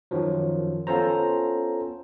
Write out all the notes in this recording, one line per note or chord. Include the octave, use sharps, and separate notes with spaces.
F#2 D#3 F3 F#3
B3 C#4 F4 A4 C5 A#5